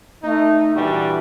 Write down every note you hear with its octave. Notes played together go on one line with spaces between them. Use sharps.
A3 D#4
A#2 E3 G3 D4 F#4